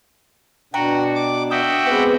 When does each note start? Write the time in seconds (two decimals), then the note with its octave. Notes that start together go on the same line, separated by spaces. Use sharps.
0.74 B2 D4 F#4 G5 A#5
1.15 D6
1.51 F#4 E5 G5 D6 D#6
1.86 G#3 B3 C4 B4 F#5 D6